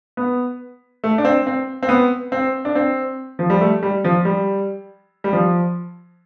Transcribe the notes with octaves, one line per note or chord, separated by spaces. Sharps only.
B3
A3
D4
C4
C4
C4
B3
C4
D4
C4
F3
G3
A3
G3
F3
G3
G3
F3